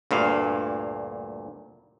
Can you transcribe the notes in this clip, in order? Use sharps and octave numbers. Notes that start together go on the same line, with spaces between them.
D2 G2 A#2 F5